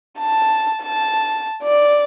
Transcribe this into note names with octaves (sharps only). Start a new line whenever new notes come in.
A5
A5
D5